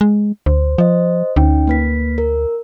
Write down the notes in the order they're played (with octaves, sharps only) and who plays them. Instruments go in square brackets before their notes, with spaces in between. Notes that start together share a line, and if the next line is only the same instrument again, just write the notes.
[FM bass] G#3
[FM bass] D2 [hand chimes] C5
[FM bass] F3 [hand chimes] C5 D#5
[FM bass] D2 [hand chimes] C#4 D#4 G5
[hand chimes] A#3 B4 B6
A#4